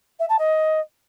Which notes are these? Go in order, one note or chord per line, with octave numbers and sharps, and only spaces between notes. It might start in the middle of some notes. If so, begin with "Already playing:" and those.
E5
A5
D#5